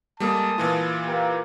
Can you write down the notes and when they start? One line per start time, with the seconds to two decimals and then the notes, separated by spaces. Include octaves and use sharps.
0.20 G3 G#3 A#3 A4 A5 D#6
0.58 A#2 E3 F4
1.06 A#3 G4